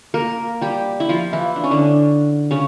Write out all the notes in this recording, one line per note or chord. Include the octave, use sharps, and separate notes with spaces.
A#3 A#4
G3 G4
E4
F3 F4
E3 E4
D4
C#4
D3 D4
C#3 C#4